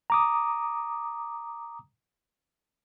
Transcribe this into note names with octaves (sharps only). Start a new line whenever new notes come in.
A#5 D6 D#6